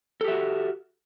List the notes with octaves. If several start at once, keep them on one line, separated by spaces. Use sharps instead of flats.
F#4 G4 A4 E5